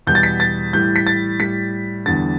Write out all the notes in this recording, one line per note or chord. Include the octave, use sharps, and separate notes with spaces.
E2 B2 G3 G6
A6
B6
A6
A2 E3 G3 G6
B6
A6
A2 G3 B6
E2 D3 G3 A6